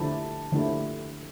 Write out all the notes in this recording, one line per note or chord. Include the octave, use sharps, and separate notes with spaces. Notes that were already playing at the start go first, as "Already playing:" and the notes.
Already playing: D3 F3 A3 E4 G4 A5
D3 F3 A3 E4 G4